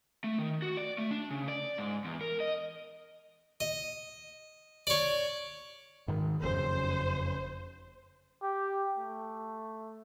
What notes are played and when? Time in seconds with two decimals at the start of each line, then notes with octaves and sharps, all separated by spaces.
0.24 A3
0.38 D#3
0.62 F#4
0.77 D5
0.98 A3
1.11 D4
1.30 C#3
1.48 D5
1.78 G#2
2.05 E2
2.21 A#4
2.40 D#5
3.60 D#5
4.87 C#5 D5
6.08 G#2 D#3
6.42 F#1 F2 C#3 C5
8.42 G4
8.98 A3